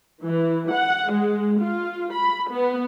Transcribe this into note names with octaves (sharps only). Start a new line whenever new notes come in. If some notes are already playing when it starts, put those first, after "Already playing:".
E3
F#5
G#3
F4
B5
B3